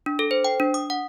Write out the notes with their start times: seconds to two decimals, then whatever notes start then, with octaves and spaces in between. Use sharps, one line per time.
0.06 D4
0.19 A4
0.31 C5
0.44 G5
0.60 D4
0.74 D#6
0.90 F#5